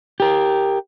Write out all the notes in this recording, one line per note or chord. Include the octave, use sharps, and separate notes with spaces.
G4 A#4